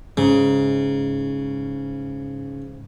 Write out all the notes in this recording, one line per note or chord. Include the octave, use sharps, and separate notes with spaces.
G#2 C#3